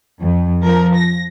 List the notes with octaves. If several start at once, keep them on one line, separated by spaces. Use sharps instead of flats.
F2
F3 A#4
A#6